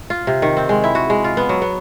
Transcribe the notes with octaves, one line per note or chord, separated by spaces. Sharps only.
F4
C3
D#3
C4
G#3
E4
F#4
G#3
F4
B3
F#3
B3